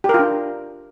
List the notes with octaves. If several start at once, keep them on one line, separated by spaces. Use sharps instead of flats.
D4 F4 G4 A#4